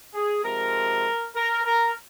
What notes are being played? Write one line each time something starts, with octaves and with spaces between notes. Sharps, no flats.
G#4
C3 F3 G#3 A#4
A#4
A#4